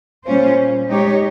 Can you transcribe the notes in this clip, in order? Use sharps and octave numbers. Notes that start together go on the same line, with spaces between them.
A#2 G3 C#4 F4 C5
G#3 D#4 G4 C#5